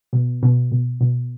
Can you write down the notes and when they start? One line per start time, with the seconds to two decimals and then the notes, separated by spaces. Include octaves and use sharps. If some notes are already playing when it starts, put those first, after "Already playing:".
0.13 B2
0.43 B2
0.72 B2
1.01 B2